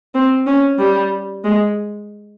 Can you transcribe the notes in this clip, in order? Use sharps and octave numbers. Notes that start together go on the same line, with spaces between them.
C4
C#4
G3
G#3